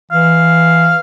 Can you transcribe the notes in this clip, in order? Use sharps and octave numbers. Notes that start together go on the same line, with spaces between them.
E3 F5